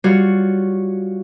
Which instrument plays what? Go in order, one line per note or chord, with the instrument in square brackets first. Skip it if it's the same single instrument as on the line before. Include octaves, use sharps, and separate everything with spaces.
[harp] G3 F4 F#4 C#5